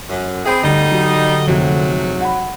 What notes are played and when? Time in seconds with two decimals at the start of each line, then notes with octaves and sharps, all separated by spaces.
0.10 F#2
0.46 C4 G#4 G5 B5
0.64 D2 G2 D3 G3 D#4 D#5
0.91 F#3
1.47 F2 G#2 C3 F#3 A3
2.21 F#5 B5